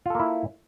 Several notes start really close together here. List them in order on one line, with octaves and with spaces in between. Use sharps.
F4 A4 A#3 E4